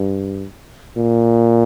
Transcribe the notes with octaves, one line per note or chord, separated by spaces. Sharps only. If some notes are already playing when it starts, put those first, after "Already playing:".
Already playing: G2
A#2